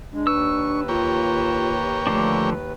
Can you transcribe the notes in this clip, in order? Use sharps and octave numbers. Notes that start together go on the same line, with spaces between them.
G#3 D4
D#2 B4 C#6 E6
A#3 F4 G4 C#5
D3 F3 A3 D4